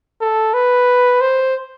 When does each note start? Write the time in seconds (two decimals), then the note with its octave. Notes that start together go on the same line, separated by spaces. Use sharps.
0.21 A4
0.54 B4
1.21 C5